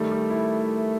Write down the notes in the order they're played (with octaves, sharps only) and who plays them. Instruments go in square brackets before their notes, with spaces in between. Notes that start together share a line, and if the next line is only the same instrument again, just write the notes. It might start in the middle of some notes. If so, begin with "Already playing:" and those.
Already playing: [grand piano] D#3 G3 [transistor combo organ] A3
[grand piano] G3
E4